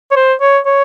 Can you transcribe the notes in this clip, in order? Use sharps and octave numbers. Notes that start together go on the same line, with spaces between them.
C#5
C5
C#5
C#5